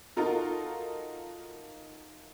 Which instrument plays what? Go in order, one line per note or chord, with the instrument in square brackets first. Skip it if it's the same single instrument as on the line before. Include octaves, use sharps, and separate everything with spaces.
[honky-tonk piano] D#4 F4 F#4 A4 A#4